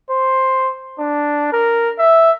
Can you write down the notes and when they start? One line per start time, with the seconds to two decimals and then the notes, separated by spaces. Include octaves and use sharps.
0.10 C5
0.99 D4
1.53 A#4
1.99 E5